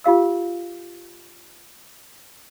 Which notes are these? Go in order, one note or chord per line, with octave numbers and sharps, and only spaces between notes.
F4 G4 F5 E6